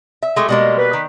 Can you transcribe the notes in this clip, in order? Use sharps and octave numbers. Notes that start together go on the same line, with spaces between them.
E5
G#3 A3 G4
B2 G3 G#3 A#3
B4
D#3